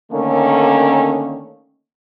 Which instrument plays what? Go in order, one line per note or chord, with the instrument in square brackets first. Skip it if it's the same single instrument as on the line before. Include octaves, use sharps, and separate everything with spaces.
[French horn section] D3 D#3 A3 A#3 C#4